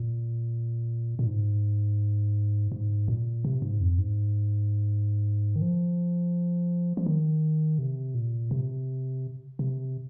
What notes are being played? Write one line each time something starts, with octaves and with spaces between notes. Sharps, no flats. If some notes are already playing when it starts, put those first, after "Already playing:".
Already playing: A#2
A#2
G#2
G#2
A#2
C3
G#2
F2
G#2
D#3
F3
F3
D#3
C3
A#2
C3
C3